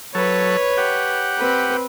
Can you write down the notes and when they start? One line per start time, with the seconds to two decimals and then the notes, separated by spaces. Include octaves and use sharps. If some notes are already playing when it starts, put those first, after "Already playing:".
0.15 F#3 A4 B4 C#5
0.77 G4 F#5
1.38 C4 B4